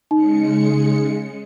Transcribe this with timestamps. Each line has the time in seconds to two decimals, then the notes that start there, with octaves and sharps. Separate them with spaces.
0.11 C#3 G#3 D#4 C#7